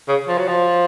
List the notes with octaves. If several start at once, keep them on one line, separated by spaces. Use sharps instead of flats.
C#3
F3
F#3
F3